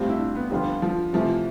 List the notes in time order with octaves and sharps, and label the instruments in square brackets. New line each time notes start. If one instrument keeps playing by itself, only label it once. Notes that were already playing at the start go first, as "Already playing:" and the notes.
Already playing: [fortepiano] A2 G3 C4 F4
[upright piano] E4
D4
B3
[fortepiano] D3 F3 B3 D4 F4 [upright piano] G3
[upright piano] F3
[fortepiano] C3 E3 A3 [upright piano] F3